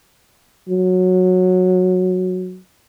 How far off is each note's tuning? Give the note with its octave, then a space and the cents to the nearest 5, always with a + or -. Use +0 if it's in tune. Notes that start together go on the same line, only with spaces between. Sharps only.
F#3 -10